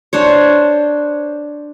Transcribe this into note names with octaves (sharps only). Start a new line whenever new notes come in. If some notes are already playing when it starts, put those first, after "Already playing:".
D4 C5 C#5